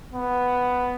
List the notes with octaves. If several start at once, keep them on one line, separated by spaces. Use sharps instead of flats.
B3